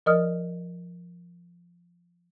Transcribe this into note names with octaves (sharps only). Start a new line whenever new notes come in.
F3 A#4 D5 D#5 D#6 F6